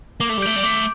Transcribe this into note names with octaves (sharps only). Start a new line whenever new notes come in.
A#3 D6
A3
G3
A3 G6 D7
G3
A3 D6